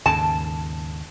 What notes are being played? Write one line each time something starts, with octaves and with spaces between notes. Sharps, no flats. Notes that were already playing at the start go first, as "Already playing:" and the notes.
D#2 G#2 C#3 A5